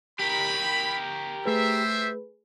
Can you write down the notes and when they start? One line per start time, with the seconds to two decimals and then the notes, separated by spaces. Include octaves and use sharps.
0.20 G4 A#4 B5
1.46 G3 A3 G#4 B4 C5 E5